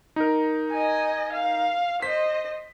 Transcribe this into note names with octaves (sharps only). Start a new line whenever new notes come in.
D#4 A#4
D#5 G#5
F5
C5 D#5 B6